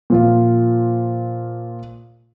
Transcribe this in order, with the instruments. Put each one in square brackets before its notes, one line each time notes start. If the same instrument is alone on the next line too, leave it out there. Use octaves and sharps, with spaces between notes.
[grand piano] A#2 F3 F4